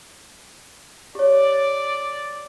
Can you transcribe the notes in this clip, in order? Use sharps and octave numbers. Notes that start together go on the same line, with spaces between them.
G4 C#5 D5